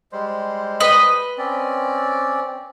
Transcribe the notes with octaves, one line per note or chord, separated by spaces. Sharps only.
G3 G#3 C5
B4 D#5
C4 C#4 D5